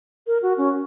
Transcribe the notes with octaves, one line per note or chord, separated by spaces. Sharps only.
A#4
F#4
C#4